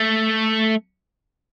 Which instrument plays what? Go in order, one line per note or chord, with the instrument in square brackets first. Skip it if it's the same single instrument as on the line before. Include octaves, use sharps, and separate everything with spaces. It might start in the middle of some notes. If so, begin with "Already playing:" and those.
Already playing: [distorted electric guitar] A3